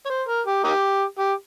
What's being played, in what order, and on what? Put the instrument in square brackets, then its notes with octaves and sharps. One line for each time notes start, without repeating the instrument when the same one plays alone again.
[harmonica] C#5
C5
A#4
G4
A#3 D#4 G4
G4